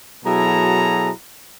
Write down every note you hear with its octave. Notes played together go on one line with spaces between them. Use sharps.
B2 F#3 E4 G#4 A4 A#5